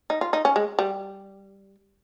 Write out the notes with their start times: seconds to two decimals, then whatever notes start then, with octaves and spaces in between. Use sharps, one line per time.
0.10 D#4
0.21 F4
0.33 D#4
0.45 C#4
0.56 G#3
0.79 G3